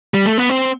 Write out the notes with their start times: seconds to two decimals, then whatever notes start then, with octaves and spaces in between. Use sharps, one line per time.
0.14 G3
0.26 A3
0.38 B3
0.49 C4